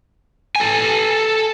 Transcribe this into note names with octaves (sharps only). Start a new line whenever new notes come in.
A4 G#5